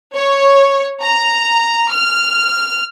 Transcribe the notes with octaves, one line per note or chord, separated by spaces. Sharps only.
C#5
A#5
F6